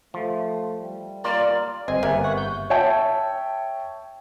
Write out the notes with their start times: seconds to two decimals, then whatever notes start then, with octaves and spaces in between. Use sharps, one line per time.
0.14 F3 A3
0.78 G3
1.24 A#3 F4 A#4 D5
1.88 G1 C4 D#5 G#5
2.03 G1 A#3 B3 G#4 E5
2.24 F#5 C#6
2.38 G6
2.70 C#5 E5 G5 A5